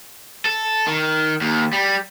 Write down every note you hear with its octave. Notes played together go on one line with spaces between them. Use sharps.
A4
D#3
D#2
G3